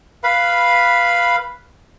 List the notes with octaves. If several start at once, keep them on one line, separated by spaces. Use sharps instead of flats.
B4 F5 B5